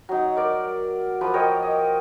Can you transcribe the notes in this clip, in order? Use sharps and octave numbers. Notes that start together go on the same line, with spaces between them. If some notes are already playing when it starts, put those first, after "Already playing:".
F#3 D#4
A#4 D5
F3 A#3 B4
A#4 C#5 D#5 G5
D#5